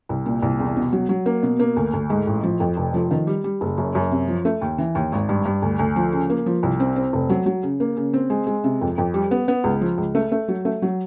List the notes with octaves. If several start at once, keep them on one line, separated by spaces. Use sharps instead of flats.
C2
A#2
C2
E2
B2
F#3
F#3
A#3
B2
A#3
D2
D2
G#2
A1
F3
F2
F1
F3
D#3
G3
G3
F#1
F#2
F#2
C3
F3
A3
D#2
E3
D#2
G#1
G2
G2
D2
D2
F3
C#3
A#3
F3
C2
C4
C4
F1
F#3
F#3
C#3
A#3
C#3
C4
G#3
G#3
C3
F2
F2
G3
B3
B3
C#2
F3
C#2
A3
A3
F#3
A3
F#3